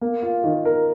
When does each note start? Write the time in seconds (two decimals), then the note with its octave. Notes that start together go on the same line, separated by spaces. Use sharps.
0.01 A#3
0.23 F4
0.44 D#3
0.65 A#4